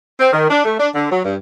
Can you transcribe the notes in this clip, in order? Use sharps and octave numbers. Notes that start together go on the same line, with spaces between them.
C4
D#3
D4
A3
D4
D3
F#3
G2